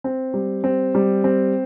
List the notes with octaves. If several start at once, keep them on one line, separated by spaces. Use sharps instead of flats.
C4
G3
C4
G3
C4